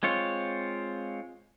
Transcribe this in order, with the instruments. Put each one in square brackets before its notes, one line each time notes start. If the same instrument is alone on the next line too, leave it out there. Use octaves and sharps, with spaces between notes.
[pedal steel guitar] G#3 C4 F4 C#5